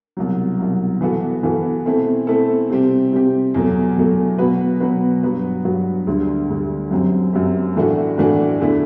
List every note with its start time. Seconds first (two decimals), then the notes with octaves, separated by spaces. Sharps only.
0.17 C2 B2 F#3
0.59 C2 B2 F#3
1.01 E3 B3 F#4 A4
1.43 E3 B3 F#4 A4
1.85 B2 A3 C4 E4 A4
2.27 B2 A3 C4 E4 A4
2.69 C3 G3 C4 G4
3.12 C3 G3 C4 G4
3.54 E2 B2 F#3 A3
3.96 E2 B2 F#3 A3
4.38 B2 F#3 B3 F#4 B4
4.80 B2 F#3 B3 F#4 B4
5.23 G2 F#3 B3 F#4 B4
5.65 G2 F#3 B3 F#4 B4
6.07 D2 D3 G3
6.50 D2 D3 G3
6.91 F#2 F#3 C4 G4
7.33 F#2 F#3 C4 G4
7.76 A2 E3 A3 D4 F#4
8.18 A2 E3 A3 D4 F#4
8.60 E2 D3 A3 E4